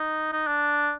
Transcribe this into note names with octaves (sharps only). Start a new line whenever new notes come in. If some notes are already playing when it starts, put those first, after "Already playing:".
Already playing: D#4
D#4
D4